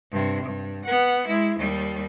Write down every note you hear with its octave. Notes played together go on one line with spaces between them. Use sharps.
G2 C3
G2
B3 F#5
G#3 E4
D#2 G3